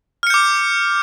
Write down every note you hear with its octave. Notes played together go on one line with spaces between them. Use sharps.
D6 F6 G6 C#7